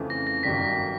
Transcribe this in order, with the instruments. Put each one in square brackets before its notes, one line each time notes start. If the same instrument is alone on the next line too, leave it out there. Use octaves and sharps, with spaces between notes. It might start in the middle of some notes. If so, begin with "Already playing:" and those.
Already playing: [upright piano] F2 C#3 E3 A3
[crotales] A#6
A#6
[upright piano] G1 F#2 D#3 G3 [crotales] B6